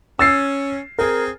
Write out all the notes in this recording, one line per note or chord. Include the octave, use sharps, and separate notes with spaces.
C#4 E6 A6 C7
C4 G#4 A#4